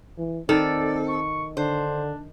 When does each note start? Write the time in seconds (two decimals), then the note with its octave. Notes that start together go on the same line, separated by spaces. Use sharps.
0.18 E3
0.49 D#3 C4 A4 D5
1.08 C#6
1.57 D3 D4 C5